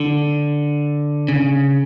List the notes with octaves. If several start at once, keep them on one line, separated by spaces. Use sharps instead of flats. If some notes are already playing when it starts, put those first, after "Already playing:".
Already playing: D3
C#3